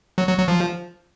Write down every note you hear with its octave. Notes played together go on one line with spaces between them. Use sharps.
F#3
F#3
F#3
F3